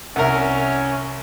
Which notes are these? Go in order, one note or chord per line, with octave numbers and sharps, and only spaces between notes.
C2 C#4 A#4 E5 F#5